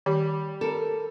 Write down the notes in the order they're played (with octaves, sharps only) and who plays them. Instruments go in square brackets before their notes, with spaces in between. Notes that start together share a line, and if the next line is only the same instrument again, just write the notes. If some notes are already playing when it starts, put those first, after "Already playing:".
[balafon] D#3 [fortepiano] G3
[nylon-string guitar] A4 A#4